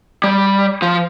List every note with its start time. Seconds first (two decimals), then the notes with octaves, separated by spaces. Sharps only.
0.24 G3
0.82 F3